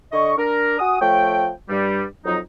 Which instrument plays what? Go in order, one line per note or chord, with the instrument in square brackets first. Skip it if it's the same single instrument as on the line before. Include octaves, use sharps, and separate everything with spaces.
[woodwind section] D3 D#5 C#6
D4 A#4
F#4 F#5 G#5 D#6
F3 A3 C#5 G5
G2 G3
F2 F#3 D#4